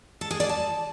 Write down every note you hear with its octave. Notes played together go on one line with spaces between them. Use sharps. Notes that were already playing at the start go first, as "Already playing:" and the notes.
A4
G#4
D5
A5